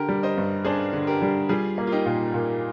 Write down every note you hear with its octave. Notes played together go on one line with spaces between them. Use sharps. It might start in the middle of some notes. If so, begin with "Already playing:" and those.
Already playing: D3 G4 A#4
G3
C5 D#5
G2
D4 G#4 C5
D3
G4 A#4
G3
G3 F4 G#4
A#3
F4
D#4 G4
A#2
A#2